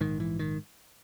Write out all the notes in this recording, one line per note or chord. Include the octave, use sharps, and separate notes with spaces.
A#1 G#2 D#3
E3
D#3